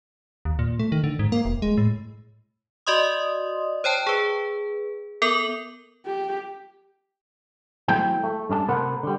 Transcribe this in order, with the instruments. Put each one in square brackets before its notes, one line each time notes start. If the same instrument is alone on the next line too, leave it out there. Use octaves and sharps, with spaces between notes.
[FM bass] D#2
A#2
A3
D#3
D3
G#2
A#3
E1
G#3
A2
[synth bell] F#4 D5 D#5 C6 D#6
C5 C#5 G5 A5
G#4 B4
B3 A4 A#4 D6 F7 F#7
[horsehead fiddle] G4
[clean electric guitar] F#3 A3 C4 E4 G5
A3
G2 C#4 D4 A5
C3 A3 A#4 C5 F#5 B5
D3 G3